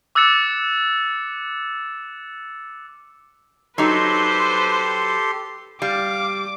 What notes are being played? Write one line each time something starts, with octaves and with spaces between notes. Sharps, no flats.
D6 E6 F#6 A6 C#7 E7
F#3 D#4 G4 A4 B4 C5 C6
G3 F5 D6